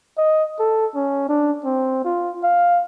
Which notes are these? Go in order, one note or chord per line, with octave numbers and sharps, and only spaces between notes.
D#5
A4
C#4
D4
C4
F4
F5